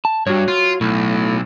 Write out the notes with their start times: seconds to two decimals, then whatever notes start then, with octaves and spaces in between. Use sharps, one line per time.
0.05 A5
0.27 G2 F#4 C#5
0.48 F4
0.81 B1 A2